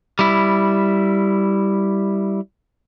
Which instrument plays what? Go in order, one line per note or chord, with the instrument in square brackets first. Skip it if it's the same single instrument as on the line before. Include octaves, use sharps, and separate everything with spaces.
[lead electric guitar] G3 E4